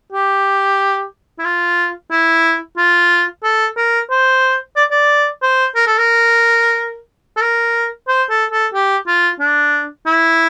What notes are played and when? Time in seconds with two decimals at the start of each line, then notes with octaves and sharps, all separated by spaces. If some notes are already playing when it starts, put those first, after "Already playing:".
0.13 G4
1.39 E4
1.45 F4
2.11 E4
2.78 F4
3.44 A4
3.77 A#4
4.11 C5
4.77 D5
4.91 D5
5.43 C5
5.76 A#4
5.87 A4
5.98 A#4
7.37 A4
7.42 A#4
8.08 C5
8.30 A4
8.52 A4
8.74 G4
9.07 F4
9.40 D4
10.06 E4